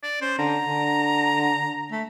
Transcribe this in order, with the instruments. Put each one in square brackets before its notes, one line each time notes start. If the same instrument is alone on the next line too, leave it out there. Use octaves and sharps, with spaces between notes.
[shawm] D5
[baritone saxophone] C#4 [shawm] C5
[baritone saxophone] D3 [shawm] A#5
[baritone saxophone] D3
A3